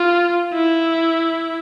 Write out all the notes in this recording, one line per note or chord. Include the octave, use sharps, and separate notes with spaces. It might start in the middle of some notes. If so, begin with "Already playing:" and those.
Already playing: F4
E4